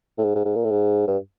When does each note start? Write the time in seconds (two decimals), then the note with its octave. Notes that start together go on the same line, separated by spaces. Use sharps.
0.18 A2
0.24 G#2
0.35 G#2
0.45 G#2
0.55 A#2
0.64 A2
0.71 G#2
1.08 G2